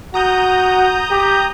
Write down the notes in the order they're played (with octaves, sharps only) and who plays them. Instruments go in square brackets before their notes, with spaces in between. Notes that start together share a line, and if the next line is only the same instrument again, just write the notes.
[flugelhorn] F#4 [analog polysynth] A#5 D#6 G6
[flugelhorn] G4